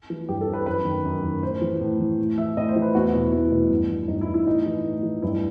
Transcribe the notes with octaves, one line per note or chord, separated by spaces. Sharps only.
E3
G2 G4
A4
E3
B4
F#2 B4
D#3
F#2
D#3
A2 C5
E3
A2
E3
A2
E3 E5
A2 D#5
C5
E3
B4
E2 F#4
B2 E4
E2 E4
B2
G2
E3
G2 D#4
E4
E3
E4
A2 D#4
E3
A2
E3
G2 E4